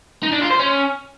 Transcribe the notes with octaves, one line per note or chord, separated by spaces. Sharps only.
D#4
D4
F4
C5
C#4